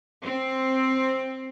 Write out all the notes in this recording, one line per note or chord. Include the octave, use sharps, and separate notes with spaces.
C4